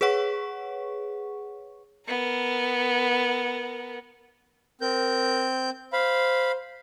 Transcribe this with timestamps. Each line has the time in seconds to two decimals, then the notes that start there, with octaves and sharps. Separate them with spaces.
0.01 G#4 B4 C#5 F#5 C#6
2.08 B3 A#4
4.81 C4 A#4 G6
5.93 C5 F5 B5